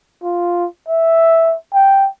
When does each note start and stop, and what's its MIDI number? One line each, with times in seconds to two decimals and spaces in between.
0.23 0.66 65
0.89 1.55 76
1.74 2.08 79